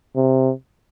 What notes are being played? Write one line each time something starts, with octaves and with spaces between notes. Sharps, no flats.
C3